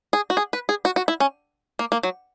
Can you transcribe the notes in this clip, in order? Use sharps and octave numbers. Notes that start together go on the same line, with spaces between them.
G#4
F#4
G#4
B4
G#4
F#4
F#4
E4
C#4
A#3
A#3
F#3